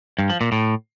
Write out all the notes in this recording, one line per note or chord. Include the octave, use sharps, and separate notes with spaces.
G2
F3
A#2
A2